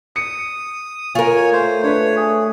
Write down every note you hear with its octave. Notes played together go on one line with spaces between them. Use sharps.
D#6 C#7
F4 A#4 C#5 G#5
A3 C5
D4 B4 C#5
G#4